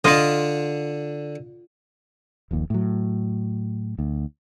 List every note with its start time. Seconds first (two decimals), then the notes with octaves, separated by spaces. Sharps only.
0.04 D3 D4 F4 D#5
2.51 D#1 A#1 D#2
2.70 A2 F#3
3.99 D2